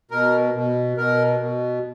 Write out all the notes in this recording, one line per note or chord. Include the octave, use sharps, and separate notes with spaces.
B2 A#4
B2
B2 A#4
B2